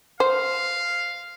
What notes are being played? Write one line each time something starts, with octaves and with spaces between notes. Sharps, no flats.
C5 F5